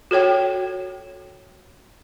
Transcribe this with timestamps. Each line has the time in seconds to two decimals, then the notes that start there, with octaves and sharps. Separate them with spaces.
0.11 F#4 A4 C#5 G5